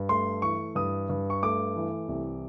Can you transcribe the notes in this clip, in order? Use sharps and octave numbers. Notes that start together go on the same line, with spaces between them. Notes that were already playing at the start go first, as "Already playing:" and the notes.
Already playing: G2
A3 C6
E3 C#6
G2 D#6
G2
C#6
A3 D6
E3
C2